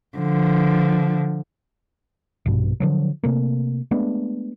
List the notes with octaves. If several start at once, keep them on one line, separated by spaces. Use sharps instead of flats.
D3 F3
A#1 G2 B2
D3 F3 F#3
C3 A3 A#3
G#3 A3 B3 D4